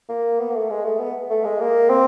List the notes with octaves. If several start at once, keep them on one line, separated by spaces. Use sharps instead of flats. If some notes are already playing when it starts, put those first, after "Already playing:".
A#3
B3
A#3
A3
G#3
A3
B3
A3
G#3
A#3
C4